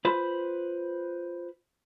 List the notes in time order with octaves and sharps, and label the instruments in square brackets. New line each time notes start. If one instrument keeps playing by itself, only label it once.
[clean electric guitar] F4 B4 C5 B5